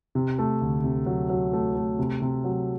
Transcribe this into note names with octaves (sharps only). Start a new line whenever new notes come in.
C3
A3
D2
C3
F#3
F#3
A3
A3
C3
C3
F#3